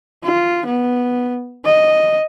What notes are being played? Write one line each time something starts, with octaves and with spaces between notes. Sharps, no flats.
F4
B3
D#5